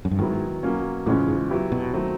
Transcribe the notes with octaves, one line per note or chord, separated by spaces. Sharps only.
F#2
G2
G#2 D#3 F#3 B3 E4
B2 F#3 A#3 C#4
E2 A2 C#3 F3 G#3 C#4
G#2
F#3 B3 E4 G4
B2
D#3 F#3 A3 C4